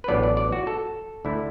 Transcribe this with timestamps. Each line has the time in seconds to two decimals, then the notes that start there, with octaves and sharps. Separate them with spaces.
0.04 B4
0.08 A1 A2 F#3 B3 D4 D5
0.23 D5
0.37 D5
0.52 F#4
0.67 A4
1.25 D2 D3 A3 E4